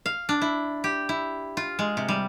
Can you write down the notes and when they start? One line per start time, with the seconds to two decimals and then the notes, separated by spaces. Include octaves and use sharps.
0.06 F5
0.29 D4
0.42 E4
0.84 G4
1.09 E4
1.57 F4
1.79 G#3
1.97 C3
2.08 G3